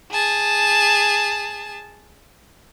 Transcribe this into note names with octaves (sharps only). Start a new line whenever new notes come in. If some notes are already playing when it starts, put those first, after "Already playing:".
G#4 A5